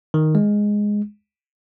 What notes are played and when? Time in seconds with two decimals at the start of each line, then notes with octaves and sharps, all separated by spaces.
0.14 D#3
0.35 G#3